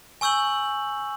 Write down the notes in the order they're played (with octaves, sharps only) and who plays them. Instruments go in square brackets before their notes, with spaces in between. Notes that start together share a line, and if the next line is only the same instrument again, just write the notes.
[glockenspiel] G#5 C#6 E6 G6 F#7